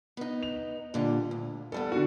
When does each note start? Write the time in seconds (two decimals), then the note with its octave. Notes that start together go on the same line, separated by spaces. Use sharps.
0.17 B3 D#4
0.43 F7
0.94 A#2 D3 G3
1.31 D2
1.72 E2 G3 B3 A4
1.92 D3 F#4